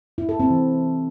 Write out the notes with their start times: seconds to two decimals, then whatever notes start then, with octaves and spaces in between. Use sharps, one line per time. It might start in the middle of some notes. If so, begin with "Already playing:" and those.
0.18 E4
0.29 A4
0.40 C4
0.50 E3